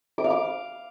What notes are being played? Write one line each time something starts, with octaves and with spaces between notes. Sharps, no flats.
D6
F5
D6